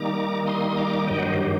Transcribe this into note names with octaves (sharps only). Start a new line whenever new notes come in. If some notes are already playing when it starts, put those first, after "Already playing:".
Already playing: D#3 G3 A#3 D#4 A#5 D6
C6 D#6
D#6
A#5 D6
G2 D#3 F#3 D#5 G5
F#5
C5 D#5
G4